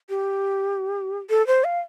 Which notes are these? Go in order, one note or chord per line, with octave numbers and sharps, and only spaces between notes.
G4
A4
C5
F5